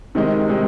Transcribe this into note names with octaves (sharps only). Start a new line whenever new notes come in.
C3 D#3 G#3 D#4
C3 D#3 G#3 D#4